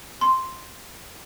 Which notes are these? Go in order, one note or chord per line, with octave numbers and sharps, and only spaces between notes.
C6